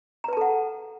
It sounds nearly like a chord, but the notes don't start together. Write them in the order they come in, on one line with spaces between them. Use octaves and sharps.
A#5 B4 A5 A4 F#5